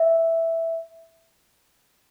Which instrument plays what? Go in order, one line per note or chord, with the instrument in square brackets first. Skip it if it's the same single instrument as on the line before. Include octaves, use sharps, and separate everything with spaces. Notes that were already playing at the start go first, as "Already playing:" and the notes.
Already playing: [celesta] E5